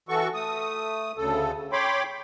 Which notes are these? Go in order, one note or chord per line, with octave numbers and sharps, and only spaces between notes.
E3 F#4 A4 C#6
A3 D#6
D2 C#3 A4
C#5 G5 B5 C6 D6